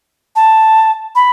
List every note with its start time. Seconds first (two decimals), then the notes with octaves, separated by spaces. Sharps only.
0.36 A5
1.16 B5